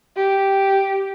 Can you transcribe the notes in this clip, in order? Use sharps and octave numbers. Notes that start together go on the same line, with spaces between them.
G4